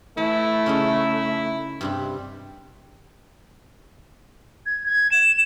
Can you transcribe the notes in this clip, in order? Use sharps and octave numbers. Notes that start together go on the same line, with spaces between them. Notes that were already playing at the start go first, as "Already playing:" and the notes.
E3 A3 E4
C#3 C#4 D#4
G2 C3 G3
G#6
G#6
E7